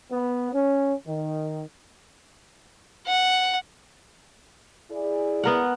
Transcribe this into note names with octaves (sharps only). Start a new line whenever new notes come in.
B3
C#4
D#3
F#5
E4 G#4 D5
B3 A#4 F#5